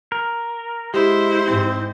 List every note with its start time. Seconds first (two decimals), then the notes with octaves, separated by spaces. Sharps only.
0.12 A#4
0.94 G#3 E4 G4 C5
1.48 G#2 C4